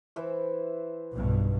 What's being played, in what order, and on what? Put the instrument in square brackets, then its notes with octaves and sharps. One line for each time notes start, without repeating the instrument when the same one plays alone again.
[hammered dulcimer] E3 C5 E5
[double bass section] B1 G2 B2